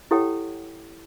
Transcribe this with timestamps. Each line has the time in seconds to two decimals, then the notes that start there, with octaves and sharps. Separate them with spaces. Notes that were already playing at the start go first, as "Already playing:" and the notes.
0.11 E4 G4 A4 C#5 F#5 G5